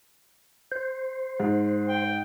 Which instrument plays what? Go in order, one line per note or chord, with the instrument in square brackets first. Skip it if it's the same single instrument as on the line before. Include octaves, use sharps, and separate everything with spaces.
[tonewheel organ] C5
[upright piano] G#2
[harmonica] G5